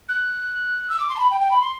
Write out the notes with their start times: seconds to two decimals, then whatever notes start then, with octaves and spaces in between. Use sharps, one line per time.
0.08 F#6
0.89 E6
0.99 D6
1.09 C6
1.16 A5
1.19 B5
1.30 G5
1.41 G5
1.50 B5
1.61 C6